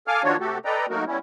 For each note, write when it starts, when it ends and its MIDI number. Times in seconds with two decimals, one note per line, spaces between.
0.07 0.23 69
0.07 0.23 77
0.07 0.23 80
0.07 0.23 86
0.07 0.23 89
0.23 0.36 51
0.23 0.36 53
0.23 0.36 62
0.23 0.36 65
0.23 0.36 66
0.23 0.36 73
0.40 0.58 48
0.40 0.58 57
0.40 0.58 66
0.40 0.58 67
0.40 0.58 69
0.65 0.86 69
0.65 0.86 71
0.65 0.86 74
0.65 0.86 75
0.65 0.86 79
0.65 0.86 82
0.90 1.04 54
0.90 1.04 57
0.90 1.04 58
0.90 1.04 63
0.90 1.04 66
0.90 1.04 70
1.07 1.18 55
1.07 1.18 59
1.07 1.18 61
1.07 1.18 64